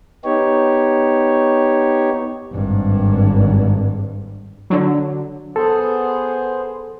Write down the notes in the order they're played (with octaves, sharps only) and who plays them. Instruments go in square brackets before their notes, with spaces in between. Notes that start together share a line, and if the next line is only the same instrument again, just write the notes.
[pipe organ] B3 D#4 G4 C#5
[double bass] G#1 G2
[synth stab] D3 F#3
[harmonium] B3 G#4 C5 [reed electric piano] A4